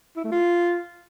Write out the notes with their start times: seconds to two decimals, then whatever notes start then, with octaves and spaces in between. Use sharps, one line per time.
0.16 E4
0.24 A3
0.32 F4